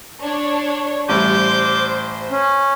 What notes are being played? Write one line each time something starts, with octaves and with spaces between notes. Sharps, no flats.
D4 C#5
A1 G3 C5 D6 G6
C#4